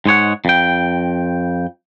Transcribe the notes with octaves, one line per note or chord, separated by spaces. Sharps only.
G#2 G#3 C#5 F#5
F2 G5